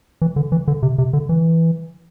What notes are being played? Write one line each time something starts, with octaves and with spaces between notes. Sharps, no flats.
E3
D3
E3
D3
C3
C3
D3
E3